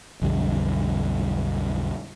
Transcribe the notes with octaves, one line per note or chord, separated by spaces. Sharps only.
B1 F2 D3 G3